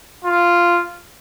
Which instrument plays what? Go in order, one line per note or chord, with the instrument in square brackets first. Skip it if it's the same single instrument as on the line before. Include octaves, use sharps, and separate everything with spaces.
[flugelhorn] F4